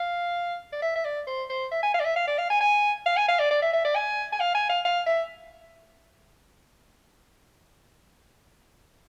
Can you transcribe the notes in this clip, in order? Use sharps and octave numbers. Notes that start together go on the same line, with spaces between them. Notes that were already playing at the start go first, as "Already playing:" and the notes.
Already playing: F5
D5
E5
E5
D5
C5
C5
E5
G#5
F5
D5
E5
F5
D5
F5
G#5
G#5
F5
G#5
F5
D5
D5
E5
E5
D5
G#5
G#5
F5
G#5
F5
F5
E5